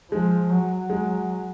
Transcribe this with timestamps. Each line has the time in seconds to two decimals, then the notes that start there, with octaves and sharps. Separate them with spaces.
0.12 F3 G#3
0.50 F#3
0.90 G#3